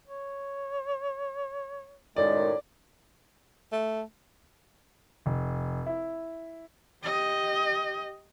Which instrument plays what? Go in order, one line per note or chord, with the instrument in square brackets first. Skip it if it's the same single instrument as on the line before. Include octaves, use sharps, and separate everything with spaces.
[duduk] C#5
[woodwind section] F#2 A2 D#3 [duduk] G#3 [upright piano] D5
[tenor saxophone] A3
[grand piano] F1
E4
[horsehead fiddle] G4 D#5